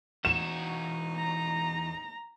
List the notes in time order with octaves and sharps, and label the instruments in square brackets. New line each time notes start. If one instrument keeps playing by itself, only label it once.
[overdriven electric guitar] E2 F#4 [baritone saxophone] D#4 [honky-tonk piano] E7
[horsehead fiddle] A#5